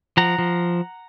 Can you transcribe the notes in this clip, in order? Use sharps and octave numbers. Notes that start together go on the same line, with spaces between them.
F3 F#5 A#5
F3